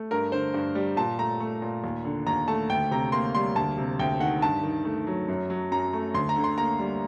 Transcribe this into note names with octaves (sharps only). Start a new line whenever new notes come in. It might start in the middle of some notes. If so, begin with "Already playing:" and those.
Already playing: A3
G2 A#4
D3 C5
G2
G3
A#2 A5
A3 A#5
A3
A#2
D#2
D3
D#2 A#5
A3 A5
D2 G5
C3 A#5
A#3 C6
G3 C6
D2 A5
C3
D2 G5
D#3 F#5
G2 A5
D#3
A3
F#3
F#2
F#3
F#2 A#5
A3
D2 C6
A#5
D3
C6
A#3 A#5
G3